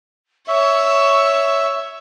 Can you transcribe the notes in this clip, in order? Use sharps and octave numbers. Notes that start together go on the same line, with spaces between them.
C#5 E5 C#6 E6